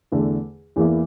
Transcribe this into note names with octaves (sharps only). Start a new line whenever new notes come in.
E2 D3 A3
E2 E3 A#3 E4